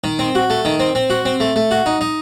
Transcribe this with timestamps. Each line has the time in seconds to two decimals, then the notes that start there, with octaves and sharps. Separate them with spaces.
0.04 D#3
0.19 C4
0.35 F#4
0.50 A3
0.65 D#3
0.80 C4
0.95 C4
1.10 F#4
1.25 C4
1.40 A3
1.56 A3
1.71 F#4
1.86 D#4
2.01 D#4